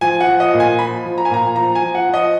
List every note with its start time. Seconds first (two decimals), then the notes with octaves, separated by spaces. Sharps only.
0.01 F3 G#5
0.21 F#5
0.27 F3
0.40 D#5
0.53 A#2
0.60 G#5
0.78 F3 B5
1.05 F3
1.18 A#5
1.25 G#5
1.30 A#2 A#5
1.56 F3 A#5
1.75 G#5
1.82 F3
1.95 F#5
2.08 F3
2.14 D#5